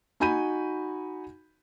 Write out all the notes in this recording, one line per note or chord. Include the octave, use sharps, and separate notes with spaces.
D#4 F#4 G#5 B5 G6 D#7